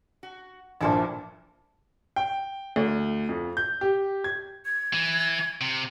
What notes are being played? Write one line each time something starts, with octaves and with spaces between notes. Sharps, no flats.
F#4
A#1 G2 A#2 E4 A4 C5
G5
D2
F2
G6
G4
G#6
G#6
E3
C3